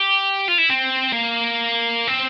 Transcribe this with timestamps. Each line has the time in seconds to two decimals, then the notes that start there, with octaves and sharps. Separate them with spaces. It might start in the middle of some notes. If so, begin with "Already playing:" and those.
Already playing: G4
0.48 F4
0.59 E4
0.70 C4
1.12 A#3
2.07 C4